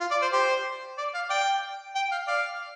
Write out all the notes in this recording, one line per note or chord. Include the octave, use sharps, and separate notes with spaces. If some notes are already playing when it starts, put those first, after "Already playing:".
F4
D5
C5
G4 C5
D5
F5
D5 G5
G5
F5
D5 F5